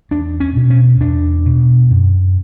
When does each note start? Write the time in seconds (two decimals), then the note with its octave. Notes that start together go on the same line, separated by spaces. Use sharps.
0.11 E2 D4
0.40 C#4
0.56 B2
0.70 C#4
1.00 E2 D4
1.45 B2
1.91 F#2